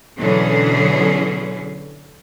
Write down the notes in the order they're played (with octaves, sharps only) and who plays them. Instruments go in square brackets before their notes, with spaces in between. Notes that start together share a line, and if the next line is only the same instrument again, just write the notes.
[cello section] B2 D3 E3 F#3 C#4 G#4